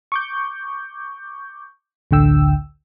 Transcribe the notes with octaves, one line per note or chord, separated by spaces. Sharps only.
C#6 D6 G6
A1 D2 D3 G5 E6